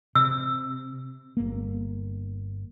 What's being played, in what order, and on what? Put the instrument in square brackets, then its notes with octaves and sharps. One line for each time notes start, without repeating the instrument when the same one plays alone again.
[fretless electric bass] C3 [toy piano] E6
[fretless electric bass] G1 A#3